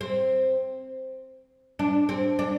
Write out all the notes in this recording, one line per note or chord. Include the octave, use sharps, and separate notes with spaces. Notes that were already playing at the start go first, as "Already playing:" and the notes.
C4
D4
C4
D4